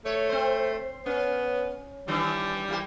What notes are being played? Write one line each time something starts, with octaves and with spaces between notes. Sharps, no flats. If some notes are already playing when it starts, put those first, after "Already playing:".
A3 C#5
C4 C5
B3 C#4
D#3 E3 G3 D4
E3 A#3 G4